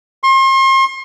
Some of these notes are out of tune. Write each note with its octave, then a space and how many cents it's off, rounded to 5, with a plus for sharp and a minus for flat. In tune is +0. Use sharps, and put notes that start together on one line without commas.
C6 +40